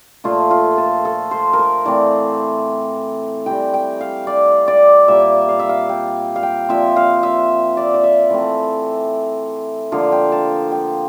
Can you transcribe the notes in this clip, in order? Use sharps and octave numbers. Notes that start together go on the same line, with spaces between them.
A#2 F3 A3 F4
F4
A4
A4
C5
A#4
C5
A2 E3 A3 C4 D5
E3 G3 C4 G5
G5
F5
D5
D5
A#2 G3 A#3 E5
F5
E5
F5
G5
F5
G5
A#2 F3 C4 E5
F5
E5
D5
D5
E5
E3 A3 C4
D3 F3 A#3 F5
G5
A5
G5